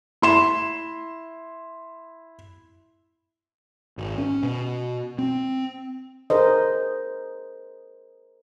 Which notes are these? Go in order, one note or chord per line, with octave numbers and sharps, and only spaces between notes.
E4 C6 E7
G#1
C#4
B2
C4
G#4 A#4 C5 D#5